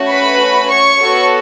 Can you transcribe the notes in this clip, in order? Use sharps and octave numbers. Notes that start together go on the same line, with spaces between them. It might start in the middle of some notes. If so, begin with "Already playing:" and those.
Already playing: A3 C#4 F#4
B4 B5
C#5 C#6
B3 F#4 A4